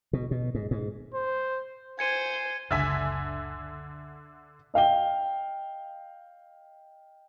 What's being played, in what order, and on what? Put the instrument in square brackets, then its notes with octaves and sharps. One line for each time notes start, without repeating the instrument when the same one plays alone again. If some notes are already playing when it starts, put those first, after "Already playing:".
[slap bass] B2
B2
G#2
G#2
[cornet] C5
[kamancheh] C5 G#5 [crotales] G#6 C#7 D#7
[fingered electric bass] F#1 C#2 [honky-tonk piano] D3 E5 G#5
[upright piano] D#5 F5 G5 G7